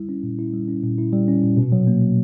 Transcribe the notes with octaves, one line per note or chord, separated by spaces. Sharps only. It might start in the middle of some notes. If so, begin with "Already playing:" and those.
Already playing: G3 E4
C#4
A#2
E4
G3
C#4
A#2
E4
G3
C#4
A#2
B2
F#3
A#3
B2